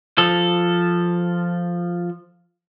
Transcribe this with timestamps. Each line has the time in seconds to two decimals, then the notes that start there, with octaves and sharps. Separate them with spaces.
0.18 F3 A4